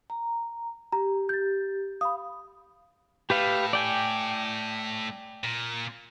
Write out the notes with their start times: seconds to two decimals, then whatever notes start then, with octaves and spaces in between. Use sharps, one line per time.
0.10 A#5
0.92 G4 A#5
1.29 G6 A6
2.01 F5 B5 D#6
3.30 A2 G4 B4 F5
3.73 D5 G5 G#5
5.44 A#2